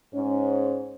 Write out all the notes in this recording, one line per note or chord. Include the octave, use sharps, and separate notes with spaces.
G#2 C#4